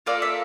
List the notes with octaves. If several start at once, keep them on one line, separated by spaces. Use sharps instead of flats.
A#3 F4 A4 D5
E5